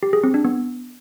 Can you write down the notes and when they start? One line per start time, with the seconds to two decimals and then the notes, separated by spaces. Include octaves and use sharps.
0.03 G4
0.13 G#4
0.24 C4
0.34 D4
0.45 B3